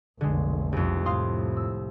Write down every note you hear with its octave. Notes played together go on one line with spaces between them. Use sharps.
F1 B1 D3 G#3
C2 F2
A2 F5 C6 D#6
E6